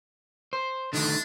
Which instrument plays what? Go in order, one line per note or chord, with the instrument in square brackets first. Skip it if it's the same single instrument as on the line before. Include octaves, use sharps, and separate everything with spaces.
[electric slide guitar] C5
[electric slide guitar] D3 D#3 A3 [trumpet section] D4